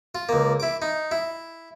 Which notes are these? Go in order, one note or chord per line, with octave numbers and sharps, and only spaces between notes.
F4
C#2 A#3
E4 D6
D#4
E4